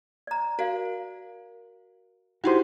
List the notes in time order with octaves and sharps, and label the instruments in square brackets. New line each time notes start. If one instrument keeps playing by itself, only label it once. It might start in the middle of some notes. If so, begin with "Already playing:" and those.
[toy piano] D5 A#5
[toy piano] F#4 D5 F5 [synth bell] A#4
[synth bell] D#4 E4 G4 [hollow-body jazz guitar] F#4 C5 [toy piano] G5